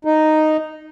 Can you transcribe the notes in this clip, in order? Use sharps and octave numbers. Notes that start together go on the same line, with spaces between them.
D#4